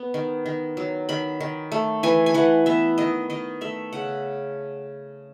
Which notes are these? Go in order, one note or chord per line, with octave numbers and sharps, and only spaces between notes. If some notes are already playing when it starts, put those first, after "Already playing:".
Already playing: B3
D#3
D#3
F#3
D#3 B5
D#3
A3
E3 G#5
G#5
E3 F#5
B3 E5
D#3 D#5
D#3 D#5
A3 E5
C#3 F#5